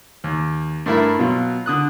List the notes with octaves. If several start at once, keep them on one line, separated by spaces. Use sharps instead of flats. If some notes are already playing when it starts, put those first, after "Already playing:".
D#2
G2 A3 E4 A#4 E5 B5
B2 F#3 F4
D3 D#6 F#6